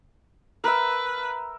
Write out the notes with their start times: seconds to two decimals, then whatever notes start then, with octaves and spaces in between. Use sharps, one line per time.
0.64 A#4 B4 E5